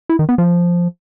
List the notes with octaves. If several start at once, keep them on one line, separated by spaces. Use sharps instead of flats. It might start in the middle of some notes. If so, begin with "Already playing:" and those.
E4
D#3
B3
F3